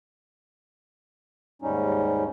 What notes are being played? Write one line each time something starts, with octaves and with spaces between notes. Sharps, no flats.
D#2 G#2 G3 C#4 D#4